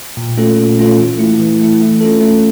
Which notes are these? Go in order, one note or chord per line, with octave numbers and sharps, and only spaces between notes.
A#2
A3 C#4 F4 A4
A#2
A3 C#4 F4 A4
E3
A3 E4
E3
A3 E4
A3
C#4 F4 A4
A3